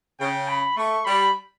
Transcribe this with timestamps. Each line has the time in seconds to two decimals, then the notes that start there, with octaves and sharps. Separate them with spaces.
0.20 C#3 G5
0.48 B5
0.76 A3 C#6
1.05 G3 B5